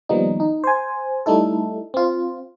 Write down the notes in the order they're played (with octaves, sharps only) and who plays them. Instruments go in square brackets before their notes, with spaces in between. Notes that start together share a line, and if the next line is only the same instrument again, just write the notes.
[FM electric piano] D#3 F3 G3 A#3 B3 D#4
D#4
C5 G#5
G3 A3 D#4 E4 A4
C4 F4